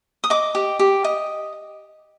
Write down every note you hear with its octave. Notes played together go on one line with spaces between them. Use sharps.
D#6
D#5 D6
G4
G4
D#5